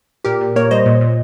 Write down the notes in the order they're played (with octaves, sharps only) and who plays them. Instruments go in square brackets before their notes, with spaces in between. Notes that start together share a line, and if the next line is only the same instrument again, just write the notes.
[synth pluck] A#2 G4 A#4
A#2
A#3 A#4 C#5
G3 C5 D#5
A#2
A#2